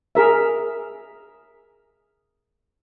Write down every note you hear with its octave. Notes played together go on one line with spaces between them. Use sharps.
G#4 A#4 E5